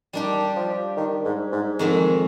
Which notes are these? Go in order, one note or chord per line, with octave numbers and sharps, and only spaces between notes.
D#3 G3 D4 G4
F3
D#3
G#2
G#2
F2 G#2 D#3 G#3